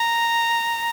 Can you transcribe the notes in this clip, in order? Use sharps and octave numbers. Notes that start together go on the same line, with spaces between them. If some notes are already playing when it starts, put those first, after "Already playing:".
Already playing: A#5